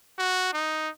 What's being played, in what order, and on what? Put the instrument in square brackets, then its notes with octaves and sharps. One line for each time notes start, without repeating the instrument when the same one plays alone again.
[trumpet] F#4
D#4